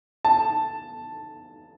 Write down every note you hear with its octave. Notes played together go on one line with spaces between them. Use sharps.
A5